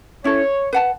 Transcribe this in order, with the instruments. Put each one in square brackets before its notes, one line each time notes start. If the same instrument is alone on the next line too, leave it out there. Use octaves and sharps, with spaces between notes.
[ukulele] C#4 E4 A4 [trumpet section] C#5
[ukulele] B4 F#5 A5